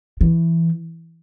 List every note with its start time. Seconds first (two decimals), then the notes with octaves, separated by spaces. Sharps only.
0.21 E3